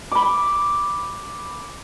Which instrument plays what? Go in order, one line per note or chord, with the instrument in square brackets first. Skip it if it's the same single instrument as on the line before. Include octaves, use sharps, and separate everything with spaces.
[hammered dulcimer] B5 D6